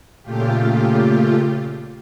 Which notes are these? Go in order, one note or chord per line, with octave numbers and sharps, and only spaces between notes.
A#2 C#3 A3 F4 G4